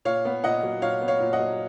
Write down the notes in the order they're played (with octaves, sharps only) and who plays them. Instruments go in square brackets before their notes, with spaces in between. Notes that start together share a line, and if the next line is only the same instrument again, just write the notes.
[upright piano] A#2 C#5 F5
B3
A#2 D#5 F#5
F#3
A#2 C#5 F5
B3
C#5 F5
A#2
D#5 F#5
F#3